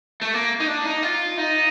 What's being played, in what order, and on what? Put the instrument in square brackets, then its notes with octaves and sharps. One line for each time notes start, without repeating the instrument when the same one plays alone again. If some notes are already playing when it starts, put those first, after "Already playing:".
[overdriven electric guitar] A3
A#3
D#4
D4
D#4
F4
D#4